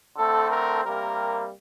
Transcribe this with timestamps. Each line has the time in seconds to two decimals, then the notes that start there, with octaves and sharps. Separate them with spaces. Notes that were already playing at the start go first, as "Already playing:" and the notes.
0.16 D3 A3 C4 A4
0.50 A#4
0.83 C3 G3 A#3 A#4